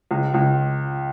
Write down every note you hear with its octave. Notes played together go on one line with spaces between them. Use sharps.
C#2
C#2